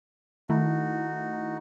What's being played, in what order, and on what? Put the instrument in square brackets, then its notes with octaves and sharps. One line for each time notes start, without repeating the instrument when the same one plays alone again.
[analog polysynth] D#3 A3 E4 [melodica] D#4 F#4